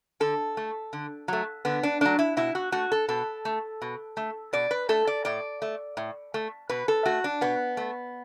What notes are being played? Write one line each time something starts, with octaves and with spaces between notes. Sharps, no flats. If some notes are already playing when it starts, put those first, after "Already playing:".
D3 A4
A3
D3
F#3 A3
D3 B3
D4
F#3 A3 D4
E4
B2 E4
F#4
A3 F#4
A4
B2 A4
A3
B2
A3
B2 D5
B4
A3 A4
D5
A2 D5
A3
A2
A3
B2 B4
A4
A3 F#4
D4
B2 B3
A3